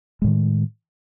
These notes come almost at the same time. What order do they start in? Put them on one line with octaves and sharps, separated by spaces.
G#3 A2 D#3